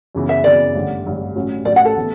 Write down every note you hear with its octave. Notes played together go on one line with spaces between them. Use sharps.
F#2 C#3 E3 B3
E5
F#2 C#3 E3 B3 D5
A1 G2 D3
A1 G2 D3
A1 A2 F#3 C#4
A1 A2 F#3 C#4 D5
F#5
A4
A2 E3 B3